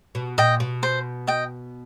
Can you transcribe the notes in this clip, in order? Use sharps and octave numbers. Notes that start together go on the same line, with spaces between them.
B2
A#2 D#5 G5
B2
C5
D#5 G5